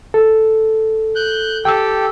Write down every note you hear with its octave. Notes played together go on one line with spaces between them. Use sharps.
A4
F#6 G6
G4 A4 G5 E6